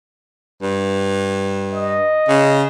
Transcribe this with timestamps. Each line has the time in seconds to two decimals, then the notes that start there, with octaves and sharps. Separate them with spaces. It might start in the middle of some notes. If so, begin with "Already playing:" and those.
0.62 G2
1.74 D#5
2.28 C#3